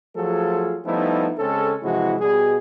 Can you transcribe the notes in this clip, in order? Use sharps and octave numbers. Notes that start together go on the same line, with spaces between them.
F3 F#3 A3 F4 G#4 A4
F3 G3 A3 B3 D#4 E4
C#3 G#3 C4 C#4 A4
C3 E3 F3 G#3 E4 F#4
B2 G3 G#4